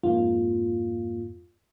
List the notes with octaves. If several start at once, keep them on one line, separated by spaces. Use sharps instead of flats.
F2 G#2 A#3 F4